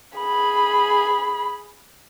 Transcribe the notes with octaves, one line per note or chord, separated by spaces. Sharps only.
G#4 B5